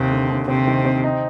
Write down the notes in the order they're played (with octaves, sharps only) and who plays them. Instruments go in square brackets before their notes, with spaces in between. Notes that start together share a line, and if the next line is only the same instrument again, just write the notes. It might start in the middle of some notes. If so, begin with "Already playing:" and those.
Already playing: [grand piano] D#2 [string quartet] C3
[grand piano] D3
D#2
[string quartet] C3 [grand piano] C4
[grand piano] D#3
C4
D#4